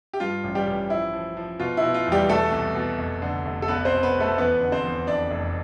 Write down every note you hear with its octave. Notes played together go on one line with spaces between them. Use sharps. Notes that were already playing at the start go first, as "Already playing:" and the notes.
G4
G2 F4
A1
G3 G4
A1
F3 E4
F3
F3
B2 F4
E4
B2
F4
E2
G3 G4
B2 A3 A4
C2
B2
F1
D3
F1
A4
B1 B3 B4
C4 C5
B2
B3 B4
B2
A3 A4
E2 B3 B4
D3
C4 C5
E2
F2 D4 D5
F1